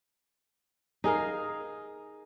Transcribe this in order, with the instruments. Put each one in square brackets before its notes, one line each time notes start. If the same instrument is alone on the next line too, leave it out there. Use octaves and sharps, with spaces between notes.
[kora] D#4 G#4 A#4 F5